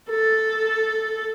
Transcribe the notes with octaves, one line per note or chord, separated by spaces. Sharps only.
A4